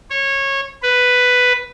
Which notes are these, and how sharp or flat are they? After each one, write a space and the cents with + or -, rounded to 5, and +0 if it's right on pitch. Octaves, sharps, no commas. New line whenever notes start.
C#5 -20
B4 +5